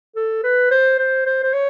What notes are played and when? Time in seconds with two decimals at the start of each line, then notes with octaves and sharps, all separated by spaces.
0.16 A4
0.43 B4
0.71 C5
0.98 C5
1.26 C5
1.43 C5
1.54 C#5